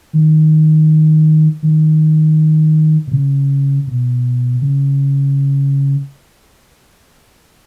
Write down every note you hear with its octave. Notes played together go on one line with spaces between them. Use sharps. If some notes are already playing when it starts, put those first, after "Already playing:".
D#3
D#3
B2
C#3
B2
C#3